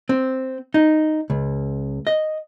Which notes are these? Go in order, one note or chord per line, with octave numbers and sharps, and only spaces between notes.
C4
D#4
C#2
D#5